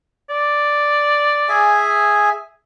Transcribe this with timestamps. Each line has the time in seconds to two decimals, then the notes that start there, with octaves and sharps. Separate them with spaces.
0.30 D5
1.49 G#4 E5 G#5